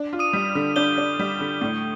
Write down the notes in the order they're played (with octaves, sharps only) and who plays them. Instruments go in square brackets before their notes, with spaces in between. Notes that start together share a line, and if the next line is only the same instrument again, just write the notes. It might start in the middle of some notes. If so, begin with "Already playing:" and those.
Already playing: [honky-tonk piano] D4
F4
[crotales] D#6 D#7
[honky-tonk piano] G3
D3
[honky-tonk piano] D4 [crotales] G6 G7
[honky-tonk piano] D4
G3
D3
A2